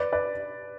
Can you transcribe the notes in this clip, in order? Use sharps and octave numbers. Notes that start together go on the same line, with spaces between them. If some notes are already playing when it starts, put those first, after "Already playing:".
Already playing: B4 D5
B4 D5